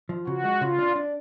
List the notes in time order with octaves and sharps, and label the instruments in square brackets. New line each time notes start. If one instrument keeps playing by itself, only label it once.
[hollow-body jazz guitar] F3
[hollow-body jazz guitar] C#3 [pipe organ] F#4
[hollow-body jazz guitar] G#3
[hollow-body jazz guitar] C#3 [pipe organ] F4
[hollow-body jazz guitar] D4
D4